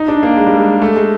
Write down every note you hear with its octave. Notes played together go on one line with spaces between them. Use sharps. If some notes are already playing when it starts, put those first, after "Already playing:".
Already playing: D#4
D4
A#3
G#3
G3
G#3
A3
G#3